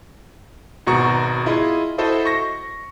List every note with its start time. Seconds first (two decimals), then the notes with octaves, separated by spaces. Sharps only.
0.87 G#1 B2 F#4 A#5 C#6
1.46 E4 F4 G#4 D#5
1.98 E4 F#4 A4 C5 D#5 E5
2.26 C#6 A#6